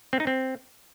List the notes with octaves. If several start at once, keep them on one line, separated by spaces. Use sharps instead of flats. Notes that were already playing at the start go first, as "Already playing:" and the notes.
C4
D#4
C4